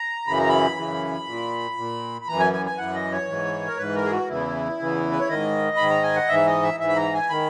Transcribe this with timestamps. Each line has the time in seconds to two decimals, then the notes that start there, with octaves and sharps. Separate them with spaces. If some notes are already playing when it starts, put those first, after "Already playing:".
Already playing: A#5
0.27 F#2 C#3 E3 B5
0.38 A#5
0.49 B5
0.77 F#2 C#3 E3
1.27 A#2
1.77 A#2
2.21 B5
2.28 F#2 E3 A#5
2.40 G#5
2.53 G#5
2.66 G#5
2.78 F#2 E3 F#5
2.95 D#5
3.12 C#5
3.27 G#2 E3
3.68 A#4
3.78 G#2 E3 B4
3.96 A#4
4.05 G#4
4.11 F#4
4.28 E2 C#3 E3 E4
4.79 E2 C#3 E3
5.11 B4
5.19 C#5
5.28 G#2 D#3 D#5
5.77 G#2 D#3 B5
5.90 A#5
6.03 G#5
6.16 F#5
6.29 G#2 E3 E5
6.46 D#5
6.63 E5
6.79 G#2 E3 E5
6.89 B5
6.96 A#5
7.14 G#5
7.30 D#3 B5